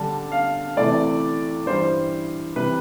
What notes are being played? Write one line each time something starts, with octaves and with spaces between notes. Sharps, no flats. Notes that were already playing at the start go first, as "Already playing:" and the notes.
Already playing: D3 G3 D4 A5
F5
C3 E3 A3 D5
G2 E3 G3 C5
C3 E3 G3 B4